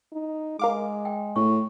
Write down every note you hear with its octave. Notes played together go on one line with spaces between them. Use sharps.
D#4
G#3 A#4 F5 D6
G5
A2 C#6